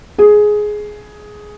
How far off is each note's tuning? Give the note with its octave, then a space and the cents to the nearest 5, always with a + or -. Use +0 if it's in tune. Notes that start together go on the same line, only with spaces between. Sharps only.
G#4 +10